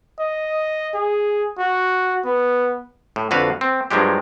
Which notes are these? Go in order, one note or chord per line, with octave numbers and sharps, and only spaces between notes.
D#5
G#4
F#4
B3
A2
F2 D3 F#4 B4 F5
C4
G2 F3 F#3 G#3 G4